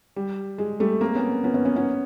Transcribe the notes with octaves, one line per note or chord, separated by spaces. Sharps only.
G3
G#3
G3 A3
A#3 C4
B3 C#4
B3 C#4
B3 C#4
B3 C#4
B3 C#4